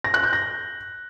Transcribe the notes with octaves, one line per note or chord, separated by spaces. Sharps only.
A#6
F#6
G6
A#6